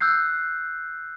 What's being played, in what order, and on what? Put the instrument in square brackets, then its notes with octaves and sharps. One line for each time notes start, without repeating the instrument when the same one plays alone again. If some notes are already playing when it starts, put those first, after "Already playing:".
[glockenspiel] E6 F#6 G6 C7